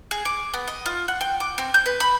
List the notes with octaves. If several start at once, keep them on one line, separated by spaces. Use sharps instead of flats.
G#4
D6
B3
D#5
F4
F#5
G5
D6
C4
G6
B4
B5